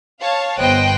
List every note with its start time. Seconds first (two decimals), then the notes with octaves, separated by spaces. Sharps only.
0.19 C#5 F5 A5
0.58 G1 B3 C5 D#5 G5 F#6